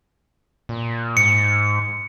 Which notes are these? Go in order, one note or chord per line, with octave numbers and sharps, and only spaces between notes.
A#2
G#2 C#7